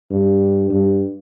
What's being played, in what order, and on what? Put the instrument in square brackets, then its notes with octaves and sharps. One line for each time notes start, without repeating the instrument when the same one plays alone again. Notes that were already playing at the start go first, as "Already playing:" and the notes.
[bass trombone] G2
G2